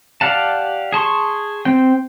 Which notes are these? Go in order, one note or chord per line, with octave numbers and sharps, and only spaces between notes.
G4 D5 F5 F#5 A5
G#4 A5 C6 C#6
C4 G5